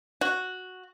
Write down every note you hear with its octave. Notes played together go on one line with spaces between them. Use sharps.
F#4